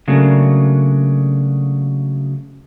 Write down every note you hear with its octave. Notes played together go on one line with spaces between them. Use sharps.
C#3 F#3 A3 A#3 D4